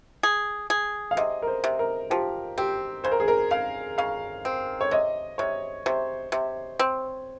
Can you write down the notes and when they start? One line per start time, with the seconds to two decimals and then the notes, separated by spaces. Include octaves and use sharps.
0.23 G#4
0.70 G#4
1.11 F5
1.17 C3 D#5
1.42 A#4
1.47 C5
1.64 C3
1.79 A#4
2.10 F3 G4
2.58 C4 G4
3.04 C#3 C5
3.12 A#4
3.20 G#4
3.28 A#4
3.51 C#3 F5
3.98 C#3 F5
4.45 C4
4.81 C#5
4.91 C3 D#5
5.38 C3 C#5
5.86 C3 C5
6.32 C3
6.79 C4